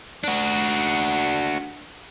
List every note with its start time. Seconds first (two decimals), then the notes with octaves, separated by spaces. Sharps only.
0.24 D4 F#4